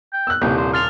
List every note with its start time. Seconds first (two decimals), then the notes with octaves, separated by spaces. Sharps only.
0.13 G5
0.27 E6 F#6
0.42 D#1 C2 G5
0.57 C5
0.73 C6 F6 A6 F7